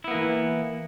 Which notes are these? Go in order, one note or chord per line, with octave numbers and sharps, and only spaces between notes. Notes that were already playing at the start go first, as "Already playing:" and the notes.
E3 A#3 B3 E4